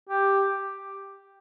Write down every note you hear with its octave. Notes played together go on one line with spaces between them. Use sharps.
G4